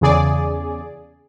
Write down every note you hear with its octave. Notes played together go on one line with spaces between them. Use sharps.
E2 C#3 G#4 D5